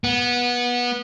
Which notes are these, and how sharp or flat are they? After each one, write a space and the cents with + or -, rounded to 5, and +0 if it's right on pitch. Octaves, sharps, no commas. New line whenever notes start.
B3 -20